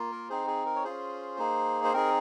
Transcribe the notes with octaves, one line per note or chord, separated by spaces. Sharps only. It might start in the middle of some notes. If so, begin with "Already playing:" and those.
Already playing: A#3 F4
A#4
C4 D#4 G#4 C5
G#4
A#4
C#5
C#4 F4 G#4 C5
A#3 D#4 G#4
C5
C4 D#4 G#4 A#4